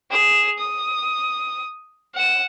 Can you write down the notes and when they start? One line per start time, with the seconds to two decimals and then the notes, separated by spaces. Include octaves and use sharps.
0.11 G#4 E7
0.58 D#6
2.15 F#5 E7